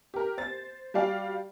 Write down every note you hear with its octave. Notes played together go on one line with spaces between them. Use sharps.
G4 A#4
C5 A6
G3 F#4 D5 F5 G5